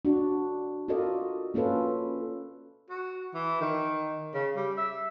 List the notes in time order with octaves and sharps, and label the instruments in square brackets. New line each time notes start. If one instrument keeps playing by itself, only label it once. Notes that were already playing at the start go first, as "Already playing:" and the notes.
[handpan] D4 F#4
F4 F#4 A4 A#4 D5 D#5
A#3 C#4 F4 A4 B4
[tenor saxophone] F#4
E3
D#3
C#3
G3
E5